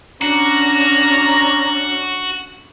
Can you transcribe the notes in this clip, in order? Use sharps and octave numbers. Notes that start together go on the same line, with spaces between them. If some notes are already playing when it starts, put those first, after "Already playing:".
C#4 D4 F#4 A#5